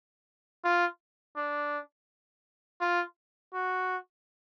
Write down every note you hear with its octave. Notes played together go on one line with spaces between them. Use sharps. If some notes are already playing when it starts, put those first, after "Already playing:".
F4
D4
F4
F#4